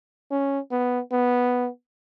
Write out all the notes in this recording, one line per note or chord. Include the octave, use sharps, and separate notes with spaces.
C#4
B3
B3